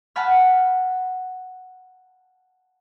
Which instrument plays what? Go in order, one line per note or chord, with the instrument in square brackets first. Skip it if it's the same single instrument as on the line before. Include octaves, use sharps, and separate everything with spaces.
[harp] F#5 G#5 A5 B5 F6